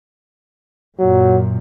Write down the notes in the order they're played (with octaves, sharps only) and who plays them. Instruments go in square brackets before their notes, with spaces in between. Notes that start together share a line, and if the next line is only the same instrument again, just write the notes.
[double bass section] F#2 A#2 [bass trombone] F#3